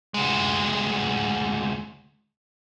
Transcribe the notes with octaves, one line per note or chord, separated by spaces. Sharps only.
D2 G#3